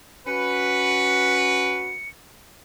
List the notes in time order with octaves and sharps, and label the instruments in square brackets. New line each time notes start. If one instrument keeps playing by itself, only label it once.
[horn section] C#4 F#4 B4 [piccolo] C#7